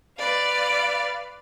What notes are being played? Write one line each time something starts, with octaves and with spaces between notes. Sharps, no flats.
B4 D5 F5